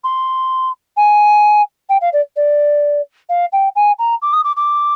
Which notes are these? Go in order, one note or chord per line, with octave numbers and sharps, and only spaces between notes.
C6
G#5
G5
F5
D5
D5
F5
G5
G#5
A#5
D6
D#6
D6
D6